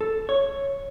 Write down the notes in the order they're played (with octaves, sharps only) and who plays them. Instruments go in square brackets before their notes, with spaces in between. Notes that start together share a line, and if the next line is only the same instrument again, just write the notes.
[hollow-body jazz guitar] A4
C#5